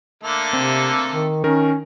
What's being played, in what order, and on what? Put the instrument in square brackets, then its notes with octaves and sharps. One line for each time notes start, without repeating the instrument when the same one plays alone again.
[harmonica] D3 A3 A#3
[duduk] C3 [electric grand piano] C4
[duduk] D#3
[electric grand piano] D#3 A#4 [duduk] C#4